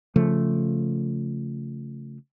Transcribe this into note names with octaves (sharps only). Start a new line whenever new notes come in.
C#3 F3 A3